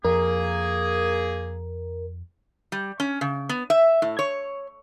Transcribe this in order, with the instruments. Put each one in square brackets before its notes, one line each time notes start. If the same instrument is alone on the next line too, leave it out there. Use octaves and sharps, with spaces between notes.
[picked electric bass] F2 [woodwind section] A#3 G#4 [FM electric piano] A#4
[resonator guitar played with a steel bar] G3
C#4
C#3
B3
E5
A2
C#5